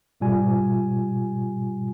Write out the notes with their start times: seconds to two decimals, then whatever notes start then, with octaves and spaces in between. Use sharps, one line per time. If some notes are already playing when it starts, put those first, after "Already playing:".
0.20 G#2 B2 G3 F4 G#5